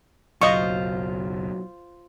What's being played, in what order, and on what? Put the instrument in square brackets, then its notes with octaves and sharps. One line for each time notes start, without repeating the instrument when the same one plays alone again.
[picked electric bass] F#1 B1 [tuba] F#3 [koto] F4 C5 [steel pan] D#5 C#6